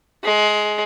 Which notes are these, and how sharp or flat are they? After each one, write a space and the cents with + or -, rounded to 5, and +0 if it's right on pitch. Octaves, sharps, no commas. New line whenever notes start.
G#3 +20